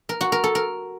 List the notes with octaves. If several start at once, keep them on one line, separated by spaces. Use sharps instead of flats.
A#4
F#4
A#4
A4
A#4